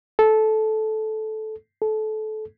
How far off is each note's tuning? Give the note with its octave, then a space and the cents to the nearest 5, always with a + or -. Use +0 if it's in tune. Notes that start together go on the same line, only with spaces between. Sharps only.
A4 -15
A4 -25